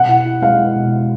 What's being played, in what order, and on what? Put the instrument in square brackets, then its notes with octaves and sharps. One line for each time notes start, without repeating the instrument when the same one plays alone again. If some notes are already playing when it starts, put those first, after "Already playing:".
Already playing: [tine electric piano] B2 [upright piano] F#5
[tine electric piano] E4
E4
[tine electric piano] G#3 [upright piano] F5
[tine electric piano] G#3
B2